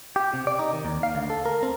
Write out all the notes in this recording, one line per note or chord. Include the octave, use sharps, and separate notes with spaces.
G4
C3
D5
D#4
D#3
D#2
F5
D2
A4
A#4
C4